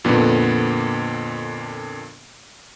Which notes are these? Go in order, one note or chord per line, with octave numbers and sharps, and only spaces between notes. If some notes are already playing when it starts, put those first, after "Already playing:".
F2 A#2 D3 B3